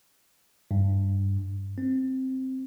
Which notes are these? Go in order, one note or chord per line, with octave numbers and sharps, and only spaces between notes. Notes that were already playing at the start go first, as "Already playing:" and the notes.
G2
C4